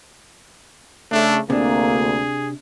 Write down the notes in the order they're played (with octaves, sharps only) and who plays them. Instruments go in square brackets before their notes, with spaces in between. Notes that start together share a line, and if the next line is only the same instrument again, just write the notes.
[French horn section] C#3 A3 [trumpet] D4
[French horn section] D2 A#3 [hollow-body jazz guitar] C3 D4 [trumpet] G#4